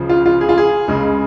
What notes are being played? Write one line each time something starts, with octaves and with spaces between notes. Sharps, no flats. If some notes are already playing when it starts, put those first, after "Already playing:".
Already playing: C#2 C#3 F3
F4
F4
G#4
F4
G#4
C#2 C#3 G#3